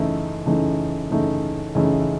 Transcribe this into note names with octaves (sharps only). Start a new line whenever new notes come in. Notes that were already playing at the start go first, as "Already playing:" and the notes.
Already playing: F#2 C#3 E3 A3 D#4
F#2 C#3 E3 A3 D#4
F#2 C#3 E3 A3 D#4
F#2 C#3 E3 A3 D#4